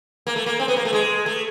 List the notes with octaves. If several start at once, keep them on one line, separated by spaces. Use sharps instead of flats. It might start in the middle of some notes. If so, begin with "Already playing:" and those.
A#3
A3
A#3
C4
B3
A#3
A3
G#3
A3